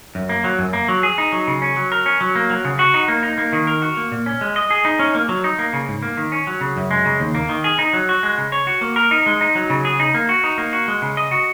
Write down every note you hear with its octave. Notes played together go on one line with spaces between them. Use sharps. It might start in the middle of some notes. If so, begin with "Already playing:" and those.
F#2
A#3
F#3
F#2
A#3
F#3
G#4
D#4
F#3
C#3
C#4
F#3
A#4
C#4
F#3
A#3
F#3
C#3
F#4
D#4
A#3
D#4
A#3
D#3
A#4
F#4
A#3
A#2
C#4
G#3
D#5
G#4
D#4
C#4
A#3
F#3
D#4
A#3
C#3
G#2
A#3
D#3
C#4
F#3
C#3
F#2
G#3
C#3
D#2
A#3
D#3
G#4
D#4
F#3
F#4
G#3
C#3
C#5
F#4
A#3
A#4
D#4
G#3
D#4
F#3
C#3
G#4
D#4
A#3
F#4
D#4
A#3
F#4
G#3
C#3
D#5
F#4